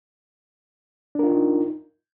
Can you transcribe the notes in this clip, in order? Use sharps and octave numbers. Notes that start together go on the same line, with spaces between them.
D4 D#4 F4 A#4